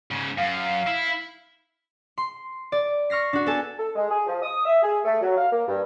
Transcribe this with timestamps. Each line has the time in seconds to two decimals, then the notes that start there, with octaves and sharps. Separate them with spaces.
0.11 G#2 C#3
0.38 F#2 F5
0.87 E4
2.18 C6
2.72 D5
3.10 C#6 F6 A#6 C7
3.33 D4 F#4
3.46 B3 A4 G#5 A5
3.78 A4
3.95 G#3
4.10 G#4
4.26 F3
4.42 D#6
4.65 E5
4.82 G#4
5.05 A3
5.21 F#3
5.37 F5
5.52 A#3
5.67 G2